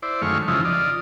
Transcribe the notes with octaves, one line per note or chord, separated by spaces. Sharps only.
E4 C5 D5
F#2 D#3 G#3 A3 F5 C#6
F2 C#3 F3 D#4 E4
F4 D5 D#5